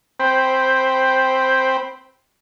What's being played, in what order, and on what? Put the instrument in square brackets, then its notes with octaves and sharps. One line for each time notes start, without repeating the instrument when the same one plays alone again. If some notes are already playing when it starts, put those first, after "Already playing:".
[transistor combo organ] C4 C5 G5 B5